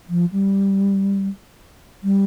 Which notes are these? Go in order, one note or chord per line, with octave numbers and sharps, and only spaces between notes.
F3
G3
G3